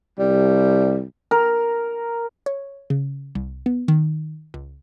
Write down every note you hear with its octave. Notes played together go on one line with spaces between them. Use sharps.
C2 G3
A#4
C#5
C#3
C2
B3
D#3
C#2